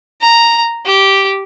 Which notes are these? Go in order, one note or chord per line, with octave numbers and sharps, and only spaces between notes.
A#5
G4